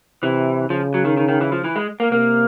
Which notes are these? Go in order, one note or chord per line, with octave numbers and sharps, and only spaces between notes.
C3 E3
C#3 F3
F#3
D#3
D#3
D#3
E3
F3
E3
G#3
A#3
C3 A#3